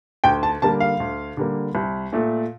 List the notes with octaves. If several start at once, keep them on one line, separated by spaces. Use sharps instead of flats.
D2 G5
A5
D3 G3 A#3 A5
F5
D2
D3 G3 A#3
C2
A#2 A3